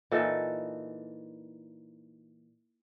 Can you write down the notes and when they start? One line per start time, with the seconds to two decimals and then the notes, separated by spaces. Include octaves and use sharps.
0.11 A#2 E3 D#4 A4